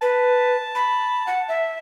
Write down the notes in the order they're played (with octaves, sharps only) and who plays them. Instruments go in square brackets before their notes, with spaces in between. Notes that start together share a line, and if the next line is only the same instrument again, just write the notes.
[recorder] B4 [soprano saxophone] A5
[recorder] B5
F#5
E5